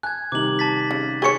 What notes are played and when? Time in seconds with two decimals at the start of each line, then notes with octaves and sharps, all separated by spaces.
0.03 G#5 F#6 G#6
0.32 C3 D#3 G3 D6 F#7
0.59 A5 A6 B6
0.91 C#3
1.22 G#4 B4 C#5 C#6 C#7